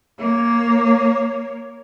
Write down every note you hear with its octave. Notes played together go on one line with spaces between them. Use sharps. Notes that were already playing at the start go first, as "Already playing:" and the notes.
A#3 C#5